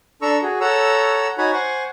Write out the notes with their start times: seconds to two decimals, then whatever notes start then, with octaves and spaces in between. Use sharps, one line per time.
0.22 D4 A4 A#5 C#6 E6
0.42 F#4 G#4
0.61 A4 C#5 F#5 A#5 E6
1.38 D#4 F#4 C#5 F#5 G#5 B5
1.53 C5 F#5 G#5 C#6